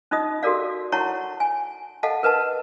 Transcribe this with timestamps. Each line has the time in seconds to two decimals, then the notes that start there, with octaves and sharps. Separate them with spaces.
0.11 C#4 D#4 F4 D#5 D#6
0.43 F#4 G4 A4 A#4 D5 F5
0.92 E4 C#5 F#5 A5 A#5 C#6
1.40 G#5
2.03 A4 D#5 F5 F#5 A5
2.23 A#4 B4 D#5 A5